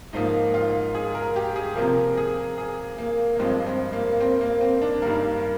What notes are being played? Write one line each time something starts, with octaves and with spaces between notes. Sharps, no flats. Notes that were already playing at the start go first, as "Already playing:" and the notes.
G#2 F3 A#3 D#4
F4
G#4
A#4
G4
G#4
C3 F3 A#3 A#4
G#4
G#4
A#3
A#3
G2 F3 G#3 C4
C4
A#3
C4
A#3
C4
D4
G2 D#3 G3 A#3 A#4